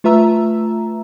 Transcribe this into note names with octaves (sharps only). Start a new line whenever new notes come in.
A3 F4 B4 E5 A#5 E6